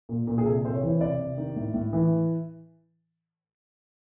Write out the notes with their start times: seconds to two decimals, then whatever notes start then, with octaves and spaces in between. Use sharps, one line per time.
0.09 A#2
0.27 A#2
0.38 G#4
0.46 C3 A4
0.64 C3 C5
0.74 C#5
0.83 E3
1.01 C3 D5
1.19 C3
1.37 D#3
1.56 A2
1.74 A2
1.93 E3